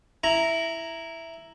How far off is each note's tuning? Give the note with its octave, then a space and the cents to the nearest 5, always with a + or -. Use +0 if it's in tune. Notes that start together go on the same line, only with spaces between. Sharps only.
E4 +0 A#5 +0